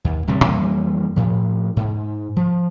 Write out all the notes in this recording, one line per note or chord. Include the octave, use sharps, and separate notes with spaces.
D#2
D1 C3 E3 G3
F2 E3 G3 A#3
A2 F3
G#2
F3